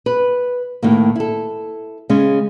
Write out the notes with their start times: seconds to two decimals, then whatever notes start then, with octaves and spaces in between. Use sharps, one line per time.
0.06 B4
0.83 A2 D#3 A#3
1.16 E4 A4
2.09 C#3 G#3 C#4